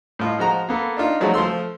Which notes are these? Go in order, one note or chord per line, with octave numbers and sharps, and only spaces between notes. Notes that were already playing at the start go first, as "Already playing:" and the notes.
A2 F4 D#5
F3 G#3 F#4 A#5
A#3 B3 A4
D4 D#4 F4
F3 F#3 G#3 A3 D#4 F#4
F3 A3 C6 E6